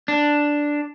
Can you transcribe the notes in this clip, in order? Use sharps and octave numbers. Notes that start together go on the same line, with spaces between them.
D4